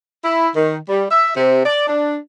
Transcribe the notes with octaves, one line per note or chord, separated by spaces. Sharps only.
E4
D#3
G3
E5
C3
D5
D4